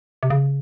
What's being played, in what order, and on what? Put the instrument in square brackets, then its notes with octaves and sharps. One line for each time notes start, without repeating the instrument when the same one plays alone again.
[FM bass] C3
C#3